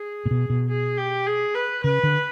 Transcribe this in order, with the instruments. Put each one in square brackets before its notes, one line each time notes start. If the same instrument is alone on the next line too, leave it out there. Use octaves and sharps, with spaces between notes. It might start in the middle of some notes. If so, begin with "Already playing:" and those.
Already playing: [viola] G#4
[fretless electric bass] A#2
B2
B2
[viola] G#4
G4
G#4
B4
[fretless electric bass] C#3 [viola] B4
[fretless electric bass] D3